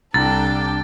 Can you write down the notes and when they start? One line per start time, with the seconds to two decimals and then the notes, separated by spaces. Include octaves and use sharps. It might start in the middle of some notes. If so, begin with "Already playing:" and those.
0.14 C2 D4 A4 G5 A#5 A6